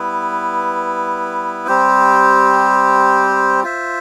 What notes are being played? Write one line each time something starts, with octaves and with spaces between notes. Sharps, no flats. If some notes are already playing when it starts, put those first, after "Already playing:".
Already playing: G3 B3 E4 B4
G3 C4 G4 C5
F4 C5 E5